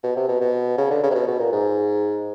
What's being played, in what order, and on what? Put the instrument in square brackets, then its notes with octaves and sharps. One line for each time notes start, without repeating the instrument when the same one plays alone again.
[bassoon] B2
C3
B2
B2
C#3
D3
C#3
C3
B2
B2
A#2
G#2